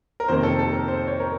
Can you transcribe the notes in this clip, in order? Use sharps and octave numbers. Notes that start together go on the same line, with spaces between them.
A#4
F2 C3 D#3 A#3 C5
A4
A4
A#4
C5
C#5
A#4